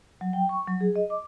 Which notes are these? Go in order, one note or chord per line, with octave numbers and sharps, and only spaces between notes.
F#3
G5
C#6
F#3
G#4
D#5
D6